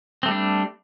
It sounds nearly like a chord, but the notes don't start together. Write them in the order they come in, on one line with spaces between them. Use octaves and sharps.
C4 A3 G3 D4